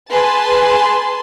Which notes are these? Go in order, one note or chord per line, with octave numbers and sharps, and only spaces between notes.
G#4 B4 G#5 A5 C6